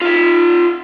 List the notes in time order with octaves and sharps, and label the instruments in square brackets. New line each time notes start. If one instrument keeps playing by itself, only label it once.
[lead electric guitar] F4 E5